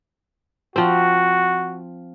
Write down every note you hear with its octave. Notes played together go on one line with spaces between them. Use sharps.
F3 C4 F#4